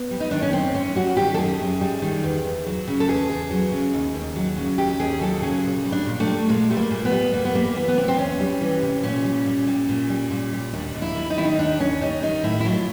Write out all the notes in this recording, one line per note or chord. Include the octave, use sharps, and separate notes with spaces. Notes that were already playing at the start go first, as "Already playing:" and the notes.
Already playing: B3
G3
D#4
D#3 D4
C#4
F#2 C4
F#2 C#4
G3 F#4
D#3 G4
A4
F#2 G#4
F#2
G3
D#3
E2
E2
F#3
C#3
A4
E2 G#4
E2
F#3
C#3
D#2
D#2
F#3
C#3
D#2 G4
D#2 G#4
F#3 A4
C#3 G#4
A#2
G3
D4
A#2
A3
G3
A#2 G#3
G3 A3
A#3
A#2
B3
G3
E2 A#3
B3
G3 A#3
E3 B3
B3
C3 C4
C4
E2 C#4
G3
E3
C3
A#2 C#4
G3
A#2
G3
A#2
G3
A#2
G3
D#2 D4
D#2
E4
G3
D#4
D#3 E4
D#4
D#2 D4
D#2 C#4
G3 D#4
D#3 D#4
A2 E4
E4
F#3 F4